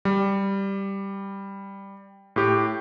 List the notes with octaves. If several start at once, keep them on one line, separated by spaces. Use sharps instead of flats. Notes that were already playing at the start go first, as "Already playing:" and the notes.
G3
A2 G4